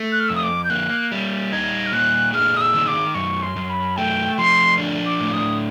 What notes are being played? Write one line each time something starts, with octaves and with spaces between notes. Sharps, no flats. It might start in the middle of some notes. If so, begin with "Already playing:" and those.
Already playing: A3
F#6
F6
F2 E6
D#6
D6
G6
A#3 F#6
G3
D#4 G#6
F6
A#2 F#6
G#3 F6
D#6
E6
D#3
D6
F#2 C#6
C6
F#2
B5
A3 G5
F3 C6
D4
D6
A2
D#6